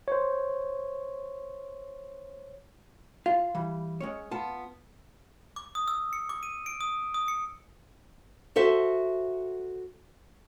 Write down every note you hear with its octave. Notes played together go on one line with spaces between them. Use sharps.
C5 C#5
F4 F5
E3 G3
G#3 C#4 C#5
B3 F4 A5
D6
D#6
E6
C#7
D6
D#7
D7
D#6
D#6
C#7
F#4 A4 C5 E5